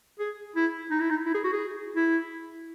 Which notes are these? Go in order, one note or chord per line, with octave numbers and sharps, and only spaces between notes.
G#4
E4
D#4
E4
D#4
E4
G#4
F#4
G#4
E4